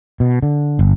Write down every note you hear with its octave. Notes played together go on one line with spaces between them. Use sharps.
B2
D3
G1